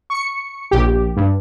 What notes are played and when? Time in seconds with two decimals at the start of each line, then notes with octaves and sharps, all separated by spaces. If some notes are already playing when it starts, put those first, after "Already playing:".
0.10 C#6 C#7
0.71 A#1 G4
1.17 G2